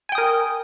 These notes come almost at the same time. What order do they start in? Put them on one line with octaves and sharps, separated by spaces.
G#5 G5 D#6 A#4